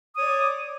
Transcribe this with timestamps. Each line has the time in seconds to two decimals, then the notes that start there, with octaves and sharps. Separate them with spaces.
0.16 D#6
0.18 C#5
0.21 D5
0.24 D6